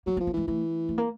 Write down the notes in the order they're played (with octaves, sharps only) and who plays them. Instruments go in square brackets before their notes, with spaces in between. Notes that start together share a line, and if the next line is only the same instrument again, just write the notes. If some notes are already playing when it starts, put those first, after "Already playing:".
[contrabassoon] F#3 [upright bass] A#3
[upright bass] A#3
[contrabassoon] F3
[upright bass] A#3
[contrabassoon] E3 [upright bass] G#3
[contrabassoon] E3 [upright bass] A3
[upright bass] A3
A#3